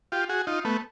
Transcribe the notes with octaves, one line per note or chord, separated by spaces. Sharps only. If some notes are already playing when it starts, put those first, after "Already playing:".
F4 G4
F#4 G#4
D#4 F4
A3 B3